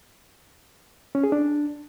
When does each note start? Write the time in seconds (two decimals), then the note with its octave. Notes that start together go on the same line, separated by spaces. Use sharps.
1.15 C#4
1.24 G#4
1.32 D4